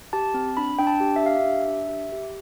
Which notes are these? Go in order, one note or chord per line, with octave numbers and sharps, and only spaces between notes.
G4 A5
C4
D4 B5
D4 G5
A5
G4
E5
G4 F5
E5
D4
D4
G4
G4